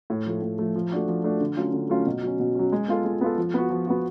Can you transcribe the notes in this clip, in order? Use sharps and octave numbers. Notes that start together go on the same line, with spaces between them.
A2
F3 A3
A2
F3 A3
F3
A3 D4 F#4
F3
A3 D4 F#4
D3
F#3 A3 C#4 F4
D3
F#3 A3 C#4 F4
B2
F#3 C#4
B2
F#3 C#4
G#3
B3 F4 A4
G#3
B3 F4 A4
F3
B3 F#4
F3
B3 F#4